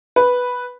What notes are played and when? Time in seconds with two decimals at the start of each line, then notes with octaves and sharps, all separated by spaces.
0.16 B4